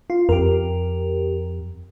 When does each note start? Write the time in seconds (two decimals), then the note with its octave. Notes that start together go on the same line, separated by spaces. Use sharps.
0.10 F4
0.29 F2 G4 A#4